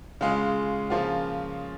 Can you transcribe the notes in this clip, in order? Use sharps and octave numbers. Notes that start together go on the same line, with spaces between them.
C#3 G#3 F4
C#3 F3 A#3 F4